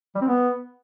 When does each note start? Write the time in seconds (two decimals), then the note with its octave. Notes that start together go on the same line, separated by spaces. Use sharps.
0.15 G3
0.21 C4
0.28 B3